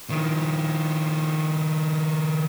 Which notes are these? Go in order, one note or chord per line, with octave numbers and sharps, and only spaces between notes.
D#3 F3